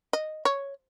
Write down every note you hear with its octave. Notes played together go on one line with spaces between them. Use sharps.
D#5
C#5